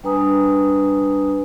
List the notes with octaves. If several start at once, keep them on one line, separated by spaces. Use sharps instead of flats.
G3 D4 B4 G#5 A#5 D#6